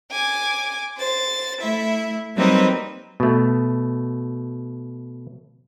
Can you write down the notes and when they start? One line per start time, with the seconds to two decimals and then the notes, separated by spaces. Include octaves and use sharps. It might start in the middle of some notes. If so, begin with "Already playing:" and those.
0.12 G#5 D6
0.99 C5 A6
1.60 A3 E4 E5
2.35 F#3 G3 A#3 C4 D#4 B4
3.20 B2 A3